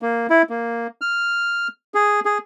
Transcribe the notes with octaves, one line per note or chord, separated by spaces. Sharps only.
A#3
E4
A#3
F6
G#4
G#4